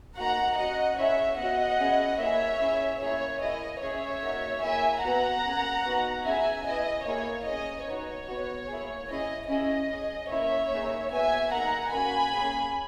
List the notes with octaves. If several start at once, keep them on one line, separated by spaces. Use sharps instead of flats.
A#3 D#4 F#4 F#5 A#5
C#4 F#4 D#5 F#5
C#4 E4 G#4 C#5 E5
B3 F#4 D#5 F#5
C#4 E4 G#4
A#3 E4 G#4 C#5 E5
C#4 E4 G#4
A#3 E4 G#4 C#5
A#3 E4 G#4 D#5
C#4 G#4 C#5 E5
A#3 D#4 F#4
A#3 E4 G#4 E5 G#5
B3 F#4 F#5 A#5
A#3 C#4 G#4
B3 D#4 F#4
C#4 E4 G#4 E5 G#5
B3 E4 G#4 D#5
A#3 E4 G#4 C#5
C#4 G#4 D#5
B3 D#4 F#4 C#5
B3 F#4
A#3 E4 G#4
C#4 E4 G#4 D#5
C#4 E4 G#4 D#5
C#4 G#4
A#3 C#4 E4 C#5 E5
A#3 D#4 G#4
B3 F#4 E5 G#5
A#3 D#4 G#4 F#5 A#5
A#3 C#4 F#4 G#5 B5
A#3 C#4 G#4